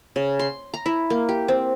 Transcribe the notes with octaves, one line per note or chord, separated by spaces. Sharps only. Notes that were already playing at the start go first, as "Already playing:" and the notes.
C#3
C6
A#5
E4
A#3
G4
C4